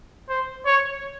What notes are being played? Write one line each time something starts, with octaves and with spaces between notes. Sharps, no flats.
C5
C#5